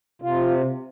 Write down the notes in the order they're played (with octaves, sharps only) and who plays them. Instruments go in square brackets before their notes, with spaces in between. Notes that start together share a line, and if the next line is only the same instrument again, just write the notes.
[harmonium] C3 F4